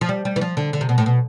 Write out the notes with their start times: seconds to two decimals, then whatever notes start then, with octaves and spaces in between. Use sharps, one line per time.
0.01 F3
0.09 G3
0.25 G3
0.36 E3
0.41 F3
0.57 D3
0.73 D3
0.81 C3
0.89 B2
0.98 A2
1.06 B2